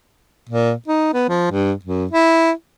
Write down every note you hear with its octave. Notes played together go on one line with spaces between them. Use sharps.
A#2
D#4
B3
F3
G2
F#2
E4